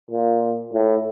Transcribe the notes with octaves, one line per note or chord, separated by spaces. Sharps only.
A#2
A2